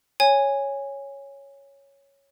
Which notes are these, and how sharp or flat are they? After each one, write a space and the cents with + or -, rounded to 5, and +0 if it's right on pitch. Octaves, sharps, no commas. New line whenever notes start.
C#5 +0 G#5 -15